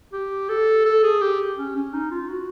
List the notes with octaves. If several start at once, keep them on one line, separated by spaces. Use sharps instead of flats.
G4
A4
A4
G#4
G4
C#4
C#4
D#4
F4
F#4